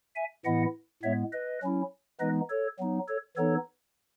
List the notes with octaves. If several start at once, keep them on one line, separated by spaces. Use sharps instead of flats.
E5 G#5
A2 E3 B3 E4 D#5 F#5
A2 G#3 B3 C#5 E5
B4 D#5
F#3 C#4 E4
E3 G#3 B3 D#4 B4 D#5
A4 C#5
F#3 B3 D#4
A4 C#5
E3 B3 D#4 A4 C#5